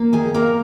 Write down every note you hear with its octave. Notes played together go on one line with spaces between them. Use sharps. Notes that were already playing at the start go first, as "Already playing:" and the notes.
Already playing: A#3
D#3 G#4 G#5
A#3 A#4 A#5